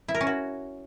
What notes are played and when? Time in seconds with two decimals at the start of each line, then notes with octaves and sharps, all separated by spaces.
0.08 E4
0.15 A#4
0.21 C#4
0.27 F#4